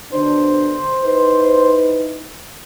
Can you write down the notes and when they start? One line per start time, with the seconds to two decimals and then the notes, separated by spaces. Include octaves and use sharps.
0.12 B2 D3 D4 C5
1.04 D#4 E4 B4